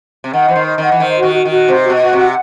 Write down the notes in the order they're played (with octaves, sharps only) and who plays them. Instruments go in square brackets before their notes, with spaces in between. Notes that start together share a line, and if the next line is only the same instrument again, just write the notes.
[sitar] C3
[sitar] D#3 [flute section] F#5
[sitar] E3 [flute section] C5
[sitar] D#3
[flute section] C5
[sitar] D#3 [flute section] F#5
[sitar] E3
[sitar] D#3 [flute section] C5
[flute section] F#4
[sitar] D#3
[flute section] F#4
[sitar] D#3
[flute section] F#4
[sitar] C3 [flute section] C5
[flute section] F#4
[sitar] B2
[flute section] F#4
[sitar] C3
[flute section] F#5